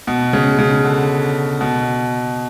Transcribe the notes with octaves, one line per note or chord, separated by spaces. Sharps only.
B2
C#3
C#3
D3
B2